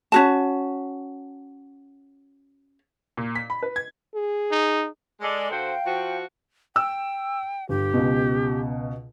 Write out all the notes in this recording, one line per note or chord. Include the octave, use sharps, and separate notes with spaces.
C#4 F#4 A5
A#2
B6
B5
B4
G#6
G#4
D#4
G#3 A4 D5 D6
D3 F#4 C5 F5 G5
F3 F#4
G5 E6
G1 G4
C#2 B2